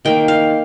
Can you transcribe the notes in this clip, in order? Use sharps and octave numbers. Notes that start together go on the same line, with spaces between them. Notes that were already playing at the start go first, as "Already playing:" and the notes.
D#3 A#3 G5
F5